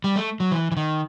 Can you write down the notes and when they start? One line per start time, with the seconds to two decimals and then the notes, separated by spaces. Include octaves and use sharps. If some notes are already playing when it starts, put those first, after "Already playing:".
0.04 G3
0.16 A3
0.40 F#3
0.52 E3
0.72 E3
0.77 D#3